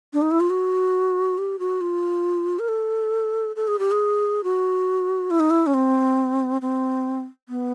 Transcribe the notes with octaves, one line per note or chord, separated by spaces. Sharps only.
D4
D#4
E4
F4
F#4
G4
F#4
F4
A#4
A4
A4
G#4
G4
G#4
F#4
E4
D#4
E4
C#4
C4
C4
B3